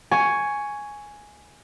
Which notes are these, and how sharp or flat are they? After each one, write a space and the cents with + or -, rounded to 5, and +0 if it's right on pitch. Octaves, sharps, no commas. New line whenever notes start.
G#5 +0 C#6 +10